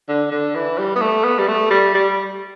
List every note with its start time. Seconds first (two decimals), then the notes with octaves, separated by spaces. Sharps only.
0.09 D3
0.31 D3
0.55 E3
0.78 G3
0.96 B3
1.01 A3
1.24 B3
1.38 G3
1.48 A3
1.71 G3
1.94 G3